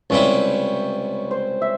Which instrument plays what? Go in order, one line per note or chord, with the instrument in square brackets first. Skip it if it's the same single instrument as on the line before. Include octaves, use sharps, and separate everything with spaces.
[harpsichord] C#2 C3 G3 C4 E4 [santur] C#5
[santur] C5
E5